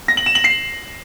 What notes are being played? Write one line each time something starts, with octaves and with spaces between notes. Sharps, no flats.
A#6
F#7
E7
F#7
C7